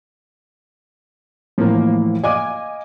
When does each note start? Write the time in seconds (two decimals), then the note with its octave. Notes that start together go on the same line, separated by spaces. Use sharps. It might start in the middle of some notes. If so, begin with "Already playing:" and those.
1.58 A2 E3 F3 A#3
2.24 D#5 F5 G#5 D6